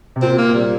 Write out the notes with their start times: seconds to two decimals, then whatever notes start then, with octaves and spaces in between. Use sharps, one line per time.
0.16 C3
0.22 A#2 C4
0.38 A#3
0.54 G3